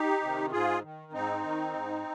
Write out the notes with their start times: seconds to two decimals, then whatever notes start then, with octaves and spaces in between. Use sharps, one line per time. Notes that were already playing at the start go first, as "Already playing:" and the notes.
Already playing: D#4 G4
0.22 C3 D#3
0.52 G#2 F4 G#4
0.83 D#3
1.13 G#2 C4 D#4
1.43 D#3
1.73 G#2